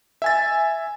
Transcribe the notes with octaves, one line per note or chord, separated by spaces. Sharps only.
E5 G#5 A6